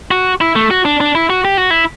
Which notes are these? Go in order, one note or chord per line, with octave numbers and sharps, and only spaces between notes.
F#4
E4
A3
F#4
D4
D4
E4
F#4
G4
F#4
E4